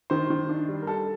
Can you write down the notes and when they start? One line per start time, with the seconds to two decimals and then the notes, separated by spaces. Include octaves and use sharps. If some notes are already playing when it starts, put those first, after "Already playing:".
0.10 D#3 C5
0.30 D#3
0.49 D4
0.68 G3
0.82 A#4
0.87 G3 A4